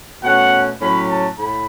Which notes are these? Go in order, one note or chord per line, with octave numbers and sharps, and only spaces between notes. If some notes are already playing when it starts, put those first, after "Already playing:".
B2 A3 C#4 F#5
A2 F#3 C#4 B5
A5
A2 B5